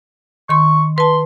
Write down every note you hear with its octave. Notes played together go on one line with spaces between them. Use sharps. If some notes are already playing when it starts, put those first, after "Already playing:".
D#3 C6 C#6
B4 A5 C6